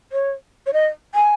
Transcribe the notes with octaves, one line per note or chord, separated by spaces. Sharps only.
C#5
C#5
D#5
G#5